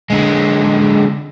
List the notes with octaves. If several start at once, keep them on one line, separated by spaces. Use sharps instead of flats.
D3 G#3